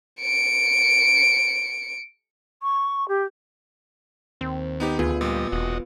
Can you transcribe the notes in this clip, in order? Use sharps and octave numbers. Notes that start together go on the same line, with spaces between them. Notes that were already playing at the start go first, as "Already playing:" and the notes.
C#7 D7
C#6
G4
D#2 C4
B3 D#4 G4
D2 B3 F4 G#4 B4
A#2 G3 D#5
E1 F#4 D#5